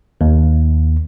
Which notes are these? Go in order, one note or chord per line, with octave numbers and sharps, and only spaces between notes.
D#2